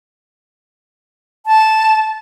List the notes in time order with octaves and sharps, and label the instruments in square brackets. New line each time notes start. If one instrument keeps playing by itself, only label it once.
[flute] A5